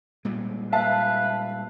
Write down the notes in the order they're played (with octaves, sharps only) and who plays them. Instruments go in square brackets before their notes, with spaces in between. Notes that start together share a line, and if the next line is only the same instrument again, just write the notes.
[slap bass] A#2 G3 G#3
[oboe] B4 [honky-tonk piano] E5 F5 A5